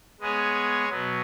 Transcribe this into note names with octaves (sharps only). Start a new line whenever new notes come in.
G#3 B3 G#4 C#5
B2 F#3 B3